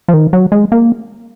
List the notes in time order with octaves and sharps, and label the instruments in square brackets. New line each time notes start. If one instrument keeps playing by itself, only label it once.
[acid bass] F3
D#3
F#3
G#3
A#3